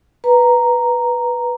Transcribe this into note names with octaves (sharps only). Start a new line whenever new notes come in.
B4 A#5